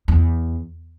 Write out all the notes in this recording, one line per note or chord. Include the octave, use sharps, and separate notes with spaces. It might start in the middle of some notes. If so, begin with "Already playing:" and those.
E2